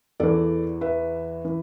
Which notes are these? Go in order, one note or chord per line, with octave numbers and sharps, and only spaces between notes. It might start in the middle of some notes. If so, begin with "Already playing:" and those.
E2 E3 A4 D5
B4 E5
E3